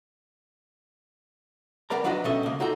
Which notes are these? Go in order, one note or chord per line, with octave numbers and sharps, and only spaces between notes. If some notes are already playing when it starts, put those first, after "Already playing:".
G3 B3 A#4 D5 A#5
F3 F#3 D4 F#4 B4 D#5
B2 G3 C#4 A4 D#5 E5
C#2 A#3
D#4 F4 F#4 A4 A#5